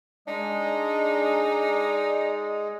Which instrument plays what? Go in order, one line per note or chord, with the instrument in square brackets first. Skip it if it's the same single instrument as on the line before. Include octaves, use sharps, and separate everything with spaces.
[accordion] G#3 [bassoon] D4 [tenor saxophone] D#4 [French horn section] D5